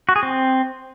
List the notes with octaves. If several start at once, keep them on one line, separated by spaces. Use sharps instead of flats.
F#4
G#4
C4